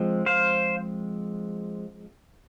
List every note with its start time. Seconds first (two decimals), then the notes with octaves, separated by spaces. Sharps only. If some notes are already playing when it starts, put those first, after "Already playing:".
Already playing: F3 G#3 C4
0.26 C5 F5